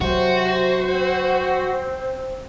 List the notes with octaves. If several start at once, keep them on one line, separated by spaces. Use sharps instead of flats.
C3 F#3 F#4 C5
C4